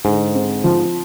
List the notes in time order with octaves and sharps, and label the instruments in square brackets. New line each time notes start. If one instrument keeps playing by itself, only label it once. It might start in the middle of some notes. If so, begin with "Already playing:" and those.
[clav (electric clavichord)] G#2 [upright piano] D3
[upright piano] C4
F3